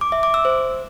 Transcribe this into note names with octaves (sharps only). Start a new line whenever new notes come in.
D6
E5
D6
E6
C5